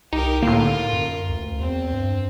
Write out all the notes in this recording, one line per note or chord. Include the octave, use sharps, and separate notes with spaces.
C2 D#4 G4 A#4
A2 D3 A#3 F4 A#4
F#2
D2
E2 C4
G2